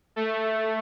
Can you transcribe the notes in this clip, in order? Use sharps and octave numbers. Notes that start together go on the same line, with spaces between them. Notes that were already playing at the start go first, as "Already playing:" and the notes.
A3